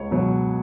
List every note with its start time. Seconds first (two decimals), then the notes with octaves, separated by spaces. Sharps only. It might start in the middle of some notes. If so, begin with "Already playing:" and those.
Already playing: C#2 C#5
0.11 B2 F#3